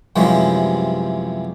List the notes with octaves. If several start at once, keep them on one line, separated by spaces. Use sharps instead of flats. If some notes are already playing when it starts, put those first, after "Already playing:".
F#2 C3 E3 F3 G3 G#3